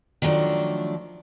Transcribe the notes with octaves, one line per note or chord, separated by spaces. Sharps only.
D#3 F3 F#3 A3 D4